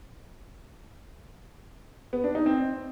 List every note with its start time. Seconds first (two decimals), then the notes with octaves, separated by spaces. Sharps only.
2.13 B3
2.24 D4
2.35 D#4
2.46 C4